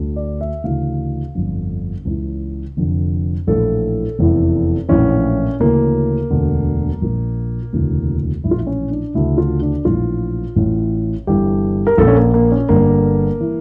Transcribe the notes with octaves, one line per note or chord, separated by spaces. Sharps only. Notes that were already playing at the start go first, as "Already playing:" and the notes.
Already playing: D2 D3
D5
E5
D2 C#3 E3 F5
G1 F2 D3
C#2 C#3 E3
F1 F2 D3
A#1 A2 E3 A4
F1 E2 E3
A#1 A2 E3 C#4
D2 C#3 E3 A#3
E1 D2 D3
A#1 A#2
E1 D2 C#3 E3
A#1 A2 E3 E4
F4
E4
C#4
D4
D2 C#3 E3 E4
F4
D4
A#1 A2 E3 F4
A1 A2 E3
G1 G2 E3 G4
A#4
A#1 A#2 A4
C#4
A#3
A#3
C#4
G1 G2 D3 A#3
E3